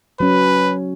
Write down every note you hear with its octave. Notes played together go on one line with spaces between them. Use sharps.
F#3 C#4 B4